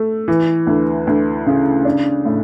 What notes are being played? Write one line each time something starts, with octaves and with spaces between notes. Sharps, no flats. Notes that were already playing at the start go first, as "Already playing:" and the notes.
Already playing: A3
E3
D2
D2
C#3
D4
A2